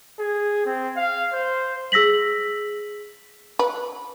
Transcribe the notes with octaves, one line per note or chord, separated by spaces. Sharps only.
G#4
C4
F5
C5
G#4 E6 A#6 B6 F#7
B4